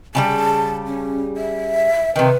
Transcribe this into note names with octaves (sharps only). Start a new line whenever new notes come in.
C#3 F#3 G3 A5
C#4
E5
C3 D#3 B4